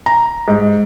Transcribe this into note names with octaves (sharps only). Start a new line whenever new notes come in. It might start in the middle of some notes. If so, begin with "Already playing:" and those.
A#5
G#2